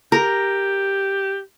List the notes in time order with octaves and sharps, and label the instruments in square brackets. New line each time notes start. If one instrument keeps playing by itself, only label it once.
[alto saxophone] G4 [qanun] A#4